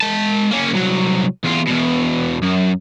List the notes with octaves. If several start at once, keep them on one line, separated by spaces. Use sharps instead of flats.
G#3 A5
A#3 C#4
C2 F#3
E2 F4
E2 B2
F#2